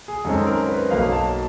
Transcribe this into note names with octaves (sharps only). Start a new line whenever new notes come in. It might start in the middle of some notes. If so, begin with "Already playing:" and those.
G#4
F#2 D#3 G#3 C4 A4
A#4
B4
B1 B2 F#3 A#3 F5
A5